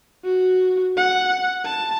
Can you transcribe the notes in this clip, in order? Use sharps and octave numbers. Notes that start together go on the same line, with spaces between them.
F#4
F#5
A5